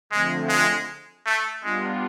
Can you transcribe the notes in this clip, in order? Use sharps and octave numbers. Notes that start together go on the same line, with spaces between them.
D3 F3 G#3 A3 C4
G#3
A3
G3 G#3 B3 D4 F4